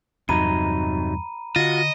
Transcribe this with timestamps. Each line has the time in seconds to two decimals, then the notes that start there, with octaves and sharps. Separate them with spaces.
0.29 E2 G2 C3 F#3 D#4 A#5 B5 D#7
1.56 D3 F4 F#4 D#5 A#6